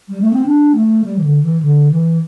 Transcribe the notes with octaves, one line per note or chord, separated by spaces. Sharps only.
G3
A3
C4
D4
A3
G3
E3
D3
E3
D3
E3